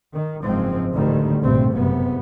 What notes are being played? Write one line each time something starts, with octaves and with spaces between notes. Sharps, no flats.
D#3
F#1 G#2 F3 G#3 C4
A1 D2 D3 D#3 G3
A#1 G2 C3 A3 C4
F#1 C3 B3